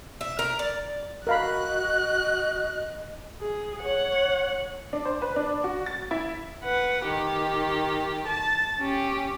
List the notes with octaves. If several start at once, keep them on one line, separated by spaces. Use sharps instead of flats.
E5
A#4
D5
F#4 A#4 D#5 F5 B5 F#6
G#4
C#5 F#5
D4
C5
B4
D4
F#4
A6
E4
B4 F#5
D#3 G4
A5
C#4 G4